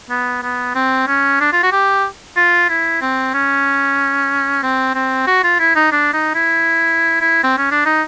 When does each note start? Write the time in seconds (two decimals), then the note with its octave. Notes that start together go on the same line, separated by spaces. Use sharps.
0.10 B3
0.43 B3
0.75 C4
1.07 C#4
1.40 D4
1.53 F4
1.63 F#4
1.72 G4
2.37 F4
2.69 E4
3.01 C4
3.34 C#4
4.63 C4
4.95 C4
5.27 F#4
5.44 F4
5.59 E4
5.76 D#4
5.92 D4
6.13 D#4
6.35 E4
7.21 E4
7.44 C4
7.58 C#4
7.71 D4
7.86 D#4